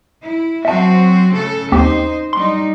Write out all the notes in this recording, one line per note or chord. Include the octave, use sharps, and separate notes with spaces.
E4
F#3 C4 F#4 E5 A5
C#3 A3 A4
D#2 C4 D#4 G4 C5
G3 D#4 C6